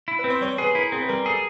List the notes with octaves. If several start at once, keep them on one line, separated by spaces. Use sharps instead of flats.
E4
B4
C4
C5
G3 C#5
G#4 B4
E4 A#4
C4 G#4
B4
G3 A#4
G#4 A4